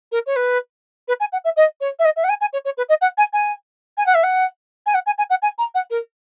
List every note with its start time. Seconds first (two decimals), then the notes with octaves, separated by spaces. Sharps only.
0.12 A#4
0.26 C#5
0.36 B4
1.08 B4
1.20 G#5
1.32 F#5
1.44 E5
1.56 D#5
1.81 C#5
1.99 E5
2.05 D#5
2.16 E5
2.24 F#5
2.29 G#5
2.41 G#5
2.53 C#5
2.65 C#5
2.77 B4
2.89 D#5
3.01 F#5
3.18 G#5
3.33 G#5
3.97 G#5
4.06 F#5
4.14 E5
4.23 F#5
4.86 G#5
4.94 F#5
5.06 G#5
5.18 G#5
5.30 F#5
5.42 G#5
5.58 A#5
5.75 F#5
5.90 A#4